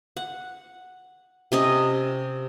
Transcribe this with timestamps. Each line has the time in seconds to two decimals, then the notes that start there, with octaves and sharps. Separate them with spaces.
0.17 F#5
1.52 C3 C#4 D#5